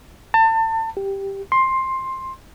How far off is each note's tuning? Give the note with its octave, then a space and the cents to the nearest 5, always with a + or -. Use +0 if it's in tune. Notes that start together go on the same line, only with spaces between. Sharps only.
A5 +30
G4 +0
C6 +10